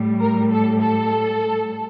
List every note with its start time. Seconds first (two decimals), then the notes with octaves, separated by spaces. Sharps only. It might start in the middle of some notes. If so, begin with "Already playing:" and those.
Already playing: A2 G3
0.21 A#4
0.52 A4
0.81 A4